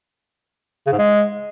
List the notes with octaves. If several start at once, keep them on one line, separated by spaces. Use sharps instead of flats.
C#3
G#2
G#3